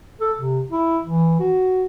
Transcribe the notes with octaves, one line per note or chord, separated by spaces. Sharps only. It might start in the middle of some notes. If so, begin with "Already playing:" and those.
A4
C3
E4
E3
F#4